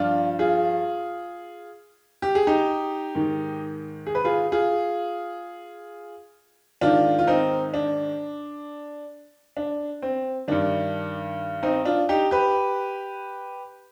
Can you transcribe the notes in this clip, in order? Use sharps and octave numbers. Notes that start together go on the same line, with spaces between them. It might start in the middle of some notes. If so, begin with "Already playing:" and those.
Already playing: G2 F3 D4 F4
F4 G#4
G4
G#4
D#4 G4
G#2 D#3
G#4
B4
F4 G#4
F4 G#4
G#2 D#3 D4 F4
F4
C4 D#4
D4
D4
C4
G2 D#3 D4
C4 D#4
D4 F4
D#4 G4
G4 B4